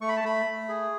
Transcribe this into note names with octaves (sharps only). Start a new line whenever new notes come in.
A3 C#6
B5
A5
A3 B5
A3
G#4